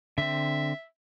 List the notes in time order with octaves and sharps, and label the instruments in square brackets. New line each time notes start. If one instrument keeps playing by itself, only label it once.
[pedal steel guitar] D3 C4 [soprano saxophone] E5